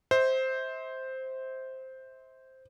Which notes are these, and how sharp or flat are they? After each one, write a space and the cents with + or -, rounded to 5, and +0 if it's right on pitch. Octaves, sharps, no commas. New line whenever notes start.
C5 +0 E5 -40